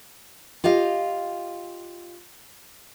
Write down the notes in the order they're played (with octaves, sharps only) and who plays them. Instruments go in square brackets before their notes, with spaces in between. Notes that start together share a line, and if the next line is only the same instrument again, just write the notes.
[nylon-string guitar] F4 G4 D#5 F5